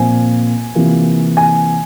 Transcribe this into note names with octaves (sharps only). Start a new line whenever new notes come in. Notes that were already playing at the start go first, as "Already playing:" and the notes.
Already playing: A#2 F3 C4 G#5
C3 E3 A#3 F4
G#5